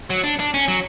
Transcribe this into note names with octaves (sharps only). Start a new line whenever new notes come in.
F#3
D4
D4
C#4
F#3